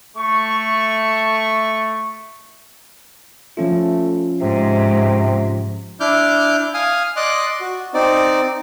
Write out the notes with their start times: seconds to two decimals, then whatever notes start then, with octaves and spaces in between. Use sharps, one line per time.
0.16 A3 C#6
3.57 F3 A3 C#4 F4
4.41 G#2 C3
6.00 D4 E4 D6 F6 G6
6.74 F5 G#5 D#6 F6
7.16 D5 D#5 C6 D6 F#6
7.61 F#4
7.94 C4 D#4 D5